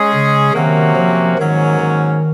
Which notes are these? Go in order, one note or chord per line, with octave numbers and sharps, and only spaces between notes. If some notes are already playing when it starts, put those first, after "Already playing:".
Already playing: G#3 C#4 G#4
C#3
C3 D#3 F#3 A#3 C#4 F#4
F3
G#2 D#3 F#3 A#3 C#4
D#3